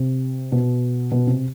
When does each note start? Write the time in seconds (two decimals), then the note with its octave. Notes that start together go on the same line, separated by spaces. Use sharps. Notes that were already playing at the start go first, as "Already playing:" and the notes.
Already playing: C3
0.52 B2
1.12 B2
1.27 C3